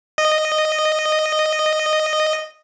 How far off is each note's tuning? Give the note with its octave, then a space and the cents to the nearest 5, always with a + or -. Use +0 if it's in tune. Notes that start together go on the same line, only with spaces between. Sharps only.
D#5 -10